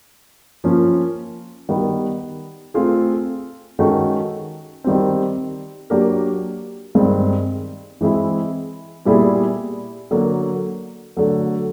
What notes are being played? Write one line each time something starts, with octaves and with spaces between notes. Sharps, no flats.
F3 A#3 C#4 F4
D#3 G3 B3
A3 C4 F4 G#4
D#3 G#3 C#4 F#4 A4
D#3 G3 C4
F#3 A#3 D4 G4 A#4
G2 D#3 G#3 C4
E3 G#3 C4 E4
A#2 G3 B3 E4 G#4
D3 F#3 A#3
D3 F#3 A3